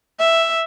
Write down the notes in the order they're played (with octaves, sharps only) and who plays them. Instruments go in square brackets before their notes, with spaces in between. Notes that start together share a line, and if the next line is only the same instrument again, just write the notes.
[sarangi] E5